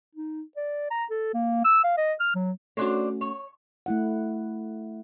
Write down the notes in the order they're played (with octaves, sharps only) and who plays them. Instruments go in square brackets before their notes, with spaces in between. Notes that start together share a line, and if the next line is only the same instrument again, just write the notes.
[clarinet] D#4
D5
A#5
A4
A#3
E6
F5
D#5
F6
F#3
[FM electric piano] A3 C#4 F#4 [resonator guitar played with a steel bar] D4 C5 C#5
[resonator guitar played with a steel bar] C#5
[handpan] A3 E4 F#5